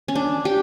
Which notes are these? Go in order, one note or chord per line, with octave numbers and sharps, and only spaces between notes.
C#4
D4
G4